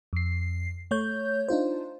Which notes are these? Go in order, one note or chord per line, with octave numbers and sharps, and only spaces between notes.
F2 C7
A3 C#5 G6
D4 D#4 F4 C5